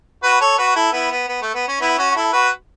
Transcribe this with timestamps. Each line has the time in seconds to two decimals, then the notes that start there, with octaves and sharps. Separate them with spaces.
0.24 F#4 B4
0.41 A4 C#5
0.59 F#4 B4
0.76 E4 A4
0.93 B3 E4
1.11 B3
1.28 B3
1.42 A3
1.54 B3
1.68 C#4
1.81 B3 E4
1.98 C#4 F#4
2.11 F#4
2.16 E4 A4
2.33 F#4 B4